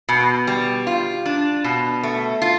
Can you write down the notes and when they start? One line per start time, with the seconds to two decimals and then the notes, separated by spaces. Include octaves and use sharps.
0.09 B2
0.47 G3
0.87 F4
1.26 D4
1.64 B2
2.03 A3
2.42 F4